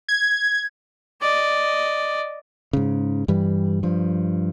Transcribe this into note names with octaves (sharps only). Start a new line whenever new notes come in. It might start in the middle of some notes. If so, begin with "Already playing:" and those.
G#6
D5 D#5
G#2 C#3
G2 E3 G3
G2 F3